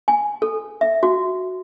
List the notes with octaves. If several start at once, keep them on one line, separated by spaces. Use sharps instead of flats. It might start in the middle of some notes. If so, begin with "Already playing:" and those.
G#5
A4
E5
F#4